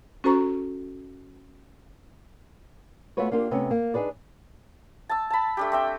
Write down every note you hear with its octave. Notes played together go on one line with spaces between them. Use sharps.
C#4 F#4 A4 C5 A#5 C#6
A3 B3 F4 F#4 B4 C#5
A#3 D4 F4 G4 A#4
C3 A3 B3 C#4
A#3
D4 D#4 F#4 G#4 B4 D5
A5 E6
A5 B5
A3 D4 G4
C4 E5 G5